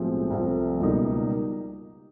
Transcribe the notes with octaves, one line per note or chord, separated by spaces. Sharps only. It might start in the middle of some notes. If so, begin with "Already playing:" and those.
Already playing: B1 A2 F3 G#3 C4
C2 C3 F3 A3
C#2 B2 G3 A#3 D#4